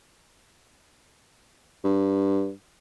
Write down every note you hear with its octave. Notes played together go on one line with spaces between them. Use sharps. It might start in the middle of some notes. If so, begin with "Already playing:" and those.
G2